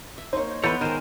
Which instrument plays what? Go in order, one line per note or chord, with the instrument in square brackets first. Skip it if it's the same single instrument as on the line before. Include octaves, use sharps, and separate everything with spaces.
[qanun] E5
[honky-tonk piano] A#3 C5 [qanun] D#4 C#5
[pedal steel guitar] E3 A4 C#5 [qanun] B3 B4 [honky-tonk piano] B5 C6 G6
[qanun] D#3 G#3 [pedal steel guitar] A#4 C5 [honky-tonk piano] F6 D#7 E7